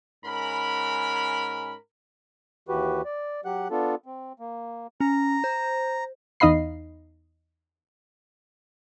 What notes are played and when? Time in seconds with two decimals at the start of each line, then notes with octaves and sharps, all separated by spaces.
0.25 G#2 C#4 A#4 B5
2.69 D#2 E3 F#4 G4 B4
3.05 D5
3.45 F#3 G4 F#5 F#6
3.71 B3 D4 F4 A4
4.06 C4
4.40 A#3
5.00 C#4 A#5
5.44 C5
6.40 E2 D#4 D#5 F5 B5 C7